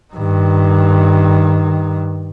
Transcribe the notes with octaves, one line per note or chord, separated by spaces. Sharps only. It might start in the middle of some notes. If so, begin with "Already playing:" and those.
G2 D#3